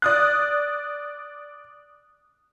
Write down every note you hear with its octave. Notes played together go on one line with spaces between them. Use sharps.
D5 D#6 F#6